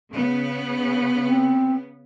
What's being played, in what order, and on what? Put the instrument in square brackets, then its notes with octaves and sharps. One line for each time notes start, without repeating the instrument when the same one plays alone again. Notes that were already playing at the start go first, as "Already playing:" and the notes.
[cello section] C#3 B3
[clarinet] C4